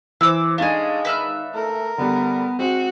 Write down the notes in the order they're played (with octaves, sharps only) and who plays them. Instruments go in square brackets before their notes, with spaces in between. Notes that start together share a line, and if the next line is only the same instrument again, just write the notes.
[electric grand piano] E3 C5 [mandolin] D6 E6
[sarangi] G#3 [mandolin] A3 G#4 [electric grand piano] D4 D#4 F5
[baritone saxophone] D#3 [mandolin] B4 E5 F6
[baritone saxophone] A3 [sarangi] A#4
[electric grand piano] D3 G3 [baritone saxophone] B3
[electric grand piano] G#3 [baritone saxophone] C4 [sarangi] F#4